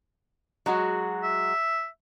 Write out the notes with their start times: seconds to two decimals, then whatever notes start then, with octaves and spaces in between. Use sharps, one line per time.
0.66 F#3 G#3 F#4
1.23 E5